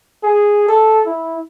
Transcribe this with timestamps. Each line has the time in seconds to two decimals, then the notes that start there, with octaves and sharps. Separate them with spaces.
0.23 G#4
0.68 A4
1.06 E4